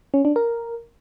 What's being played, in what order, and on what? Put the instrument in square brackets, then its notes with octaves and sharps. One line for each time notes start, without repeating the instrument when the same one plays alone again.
[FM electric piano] C#4
D4
A#4